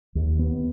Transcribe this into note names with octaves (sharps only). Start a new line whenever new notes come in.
D#2
B3